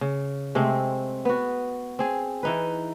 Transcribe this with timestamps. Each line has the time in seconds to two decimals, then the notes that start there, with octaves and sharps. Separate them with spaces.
0.01 C#3
0.55 C3 G#3 A3 C4
1.25 B3 F#4
1.99 C4 G#4
2.43 E3 D#4 B4